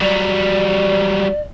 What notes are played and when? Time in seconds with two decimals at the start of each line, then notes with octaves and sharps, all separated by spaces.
0.01 F#3 G3 D5